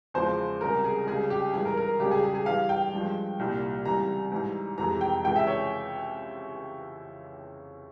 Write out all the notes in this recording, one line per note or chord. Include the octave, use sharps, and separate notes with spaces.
E2 C#3 F3 G#3 C5
C#2 C3 G3 A#4
G#4
C#2 C#3 G3 G#4
G4
G2 E3 G#3 G#4
A#4
A#4
C#2 C#3 G3 G4
G#4
G#4
G#4
G2 E3 G3 F5
G5
G2 F3 G#3
C2 A#2 G3
C#2 C3 E3 G3 A#5
G#2 E3 G3
F2 C3 E3 G#3 A#5
G5
C#2 C3 E3 G#3 G5
E5
C#5